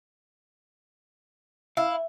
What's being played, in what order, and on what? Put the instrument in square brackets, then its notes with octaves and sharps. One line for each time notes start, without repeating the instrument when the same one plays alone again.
[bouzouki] E4 [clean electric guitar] F5